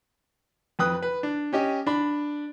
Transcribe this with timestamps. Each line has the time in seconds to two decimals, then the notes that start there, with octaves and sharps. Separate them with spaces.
0.79 F2 B4 G5 D#6 F#6
1.02 B4
1.23 D4
1.53 C#4 G4 D#5
1.87 D4 B5